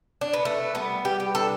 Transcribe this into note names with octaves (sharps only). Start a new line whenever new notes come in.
D4
B3
A3 B4
G3 B3
G3 G4
G4
D4 A4